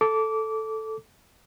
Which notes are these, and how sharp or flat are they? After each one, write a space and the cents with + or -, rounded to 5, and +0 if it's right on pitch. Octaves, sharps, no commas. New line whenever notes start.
A4 +0 D6 -20